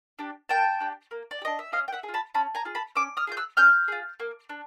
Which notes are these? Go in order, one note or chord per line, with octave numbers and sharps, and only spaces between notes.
D4 G4
A#3 G5 A5
D4 G4
A#3
D5
G4
D4 D#5
E5
C#4 D#5 F5
G5
E5 F#5
G#4
F4
A5 B5
C#4 A5 B5
G#5 A#5
F4 G#4
A5 B5
C#4 D6 E6
D#6 F6
F4 G#4 G6
E6 F#6
C#4 F6 G6
F4 G#4
A#3
D4